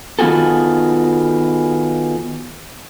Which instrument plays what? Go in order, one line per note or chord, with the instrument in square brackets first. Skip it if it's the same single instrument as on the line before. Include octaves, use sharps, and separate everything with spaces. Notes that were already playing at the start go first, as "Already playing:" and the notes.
[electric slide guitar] D#3 B3 F4 F#4 G#4 A4